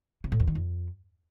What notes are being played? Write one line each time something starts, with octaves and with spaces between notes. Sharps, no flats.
C3
A2
E2
D#3
F2